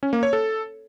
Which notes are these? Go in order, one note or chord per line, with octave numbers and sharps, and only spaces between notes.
C#4
A#3
C#5
A4